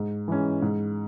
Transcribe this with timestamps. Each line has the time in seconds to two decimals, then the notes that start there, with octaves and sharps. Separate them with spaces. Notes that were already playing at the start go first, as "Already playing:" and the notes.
Already playing: G#2
0.28 E3 G#3 C#4
0.62 G#2